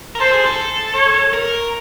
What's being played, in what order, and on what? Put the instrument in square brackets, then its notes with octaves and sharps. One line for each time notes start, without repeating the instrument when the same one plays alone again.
[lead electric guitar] A#4
[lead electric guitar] A4 [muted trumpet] C5
[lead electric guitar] G#4
A4
[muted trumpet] C#5
[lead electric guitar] A#4